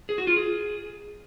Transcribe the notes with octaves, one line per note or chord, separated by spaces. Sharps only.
G#4
F#4
F4
G#4